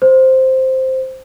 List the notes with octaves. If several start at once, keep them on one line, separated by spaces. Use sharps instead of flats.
C5